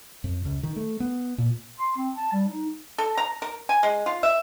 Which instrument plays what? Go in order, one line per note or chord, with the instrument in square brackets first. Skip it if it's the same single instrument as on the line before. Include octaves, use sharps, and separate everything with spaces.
[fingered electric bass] F2
C#2
D#3
A3
B3
A#2
[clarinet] C6
C4
A5
G3
D#4
[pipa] A4
A#5
A#4
G#5
G#3
F4
E5